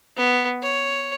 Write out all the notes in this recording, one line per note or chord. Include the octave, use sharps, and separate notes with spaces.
B3
C#5